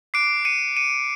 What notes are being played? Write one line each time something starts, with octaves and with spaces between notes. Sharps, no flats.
D6 F#6 C7 D7
C#7 D#7
C#7 D#7